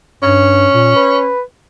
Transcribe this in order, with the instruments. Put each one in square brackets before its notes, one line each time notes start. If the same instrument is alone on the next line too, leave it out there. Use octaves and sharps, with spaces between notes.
[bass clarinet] G2 [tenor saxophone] C#4
[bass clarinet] A#2
B4